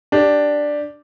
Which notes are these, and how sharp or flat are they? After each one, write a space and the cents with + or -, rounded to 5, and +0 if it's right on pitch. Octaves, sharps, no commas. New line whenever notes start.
D4 +0 G4 +0